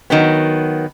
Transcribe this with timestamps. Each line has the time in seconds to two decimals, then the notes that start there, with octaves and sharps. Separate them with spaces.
0.10 D#3 F#3 B3